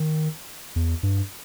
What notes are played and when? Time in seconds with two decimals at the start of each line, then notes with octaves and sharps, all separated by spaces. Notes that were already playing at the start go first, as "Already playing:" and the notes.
Already playing: D#3
0.76 E2
1.03 G2